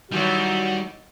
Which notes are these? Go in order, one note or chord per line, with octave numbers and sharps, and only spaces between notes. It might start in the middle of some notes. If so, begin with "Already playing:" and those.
D#3 E3 F#3 G3 F#4